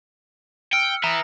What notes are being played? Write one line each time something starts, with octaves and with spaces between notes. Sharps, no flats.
G5 E6 F6 C#7
B4 E5 A#5 D#6 A#6